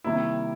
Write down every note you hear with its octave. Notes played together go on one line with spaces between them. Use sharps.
C3 D#3 G3 A#3 E4